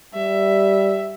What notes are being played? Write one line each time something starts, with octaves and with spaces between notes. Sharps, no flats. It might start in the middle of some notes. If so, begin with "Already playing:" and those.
G3 E5